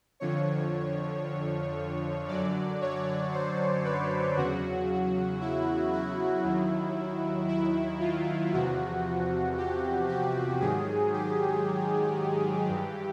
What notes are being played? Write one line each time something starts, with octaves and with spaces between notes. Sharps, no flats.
F2 D3 F3 C#5
F#2 D3 F#3 D5
C#5
C5
B4
E2 C#3 F#3 F#4
E4
E4
D#2 D#3 F#3
E4
F4
E2 C3 F3 F#4
G4
G4
G#2 D#3 F#3 G#4
G4
G2 E3